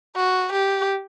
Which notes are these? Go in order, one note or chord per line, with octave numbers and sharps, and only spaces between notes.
F#4
G4